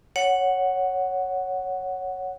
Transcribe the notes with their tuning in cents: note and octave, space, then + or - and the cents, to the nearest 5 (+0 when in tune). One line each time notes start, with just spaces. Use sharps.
C#5 +0 F#5 +0